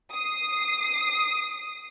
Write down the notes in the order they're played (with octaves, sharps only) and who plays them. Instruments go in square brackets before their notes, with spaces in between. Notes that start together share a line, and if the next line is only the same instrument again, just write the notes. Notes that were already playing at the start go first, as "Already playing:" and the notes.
[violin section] D#6 C7